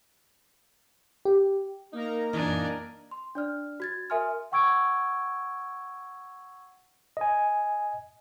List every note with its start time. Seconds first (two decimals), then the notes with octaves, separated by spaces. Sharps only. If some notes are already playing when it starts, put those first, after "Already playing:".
1.25 G4
1.93 A#3 D#4 A#4 A#5
2.33 F#2 A#2 E3 D4 D#4 G#5
3.11 C6
3.35 D4 D5 F6
3.80 F#4 G#6 A6
4.10 A#4 E5 G#5 C6 F6
4.52 F#5 G5 C#6 E6 G#6 D7
7.17 D#5 G#5